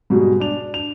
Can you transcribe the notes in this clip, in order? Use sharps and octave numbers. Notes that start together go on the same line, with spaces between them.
G#2 B2 G3 G#3
D4 F7
F7